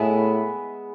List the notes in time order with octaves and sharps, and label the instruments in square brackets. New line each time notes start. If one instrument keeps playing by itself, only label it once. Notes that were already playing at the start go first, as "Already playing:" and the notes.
Already playing: [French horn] A2 [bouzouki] G#3 B3 E4 G#4